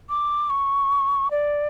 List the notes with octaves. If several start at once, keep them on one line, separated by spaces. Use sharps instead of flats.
D6
C#6
D5